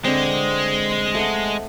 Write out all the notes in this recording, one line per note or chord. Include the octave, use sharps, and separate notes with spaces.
D3 G#3 C4
A3 D#5 F#5